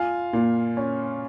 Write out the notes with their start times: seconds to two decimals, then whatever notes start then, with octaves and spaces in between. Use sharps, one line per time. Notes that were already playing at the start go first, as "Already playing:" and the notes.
Already playing: F4 F5 G#5
0.33 A#2
0.77 C#4